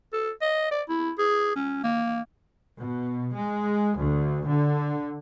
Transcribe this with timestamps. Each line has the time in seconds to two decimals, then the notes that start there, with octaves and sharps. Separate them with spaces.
0.13 A4
0.42 D#5
0.71 D5
0.89 E4
1.18 G#4
1.56 C#4
1.83 A#3
2.79 B2
3.35 G#3
3.97 D2
4.48 D3